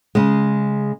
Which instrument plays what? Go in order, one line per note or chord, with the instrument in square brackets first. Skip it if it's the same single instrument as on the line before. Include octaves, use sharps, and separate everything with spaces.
[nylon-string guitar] C#3 G#3